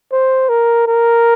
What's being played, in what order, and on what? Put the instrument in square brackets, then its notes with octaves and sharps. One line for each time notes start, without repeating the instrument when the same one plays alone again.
[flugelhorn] C5
A#4
A#4